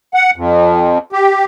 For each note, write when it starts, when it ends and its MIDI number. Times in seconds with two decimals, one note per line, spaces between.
0.14 0.31 78
0.36 0.98 41
1.12 1.45 67